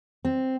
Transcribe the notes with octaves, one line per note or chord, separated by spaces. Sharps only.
C4